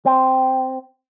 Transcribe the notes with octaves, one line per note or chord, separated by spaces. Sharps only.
C4